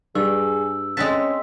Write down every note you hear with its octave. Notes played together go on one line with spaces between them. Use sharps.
G2 G#4 E6
G#3 C4 C#4 F#5 A5 B6